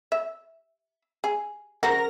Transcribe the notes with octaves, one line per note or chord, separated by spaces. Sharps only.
E5
G#4
C#3 F3 F#4 A#4 A#6